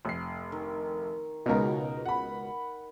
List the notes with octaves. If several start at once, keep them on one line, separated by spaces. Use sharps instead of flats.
F1 C7
D#3
C#2 B2 D#4 A#4 A#5
F#5 B5